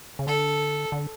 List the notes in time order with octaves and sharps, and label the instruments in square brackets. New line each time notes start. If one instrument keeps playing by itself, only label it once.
[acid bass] C#3
[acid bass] D3 [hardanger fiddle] A4
[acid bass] D3